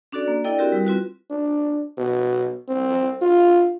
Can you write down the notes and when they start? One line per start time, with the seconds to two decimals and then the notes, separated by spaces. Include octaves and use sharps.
0.12 C#4 D4 F#4 A4 D5
0.28 A#3
0.44 D4 E4 A4 D5 D#5 G5
0.58 C4 E4 F#4 G4 A#4
0.72 G3 E4
0.85 C4 F4 F#4 B4
1.31 D4
1.98 B2
2.69 C4
3.22 F4